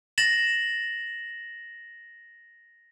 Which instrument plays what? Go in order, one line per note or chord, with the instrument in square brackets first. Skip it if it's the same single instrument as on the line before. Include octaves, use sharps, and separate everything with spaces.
[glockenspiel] A6 A#6 E7 F#7